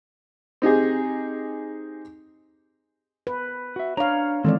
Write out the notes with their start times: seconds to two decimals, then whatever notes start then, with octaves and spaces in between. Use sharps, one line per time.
0.62 C4 D#4 G4 G#4
3.27 B4
3.76 F#4 E5
3.97 D4 C#5 F5 A#5
4.44 D#3 E3 G#3 C4 A4 D5